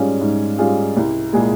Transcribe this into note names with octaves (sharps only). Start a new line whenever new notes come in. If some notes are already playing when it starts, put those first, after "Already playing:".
Already playing: G#2 G3 C#4 F4 G#4
G#2
G3 C#4 F4 G#4
C2
A#2 G#3 E4 G#4